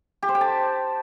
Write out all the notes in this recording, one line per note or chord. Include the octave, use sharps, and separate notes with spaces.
G4
C5
G5
A5